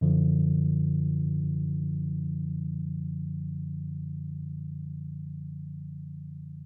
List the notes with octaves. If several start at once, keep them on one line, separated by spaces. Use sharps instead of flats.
F#2 D3 F3